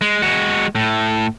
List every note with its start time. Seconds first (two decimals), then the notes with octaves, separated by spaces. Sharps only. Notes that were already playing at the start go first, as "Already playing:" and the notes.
0.01 G#3
0.22 G#3 F#4
0.75 A2